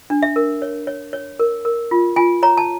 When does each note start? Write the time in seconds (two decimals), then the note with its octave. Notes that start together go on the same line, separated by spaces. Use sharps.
0.10 D4
0.23 E5
0.36 A#4
0.62 C#5
0.87 C#5
1.13 C#5
1.39 A#4
1.65 A#4
1.91 F4
2.16 F4 G#5
2.43 C#5 A#5
2.57 A5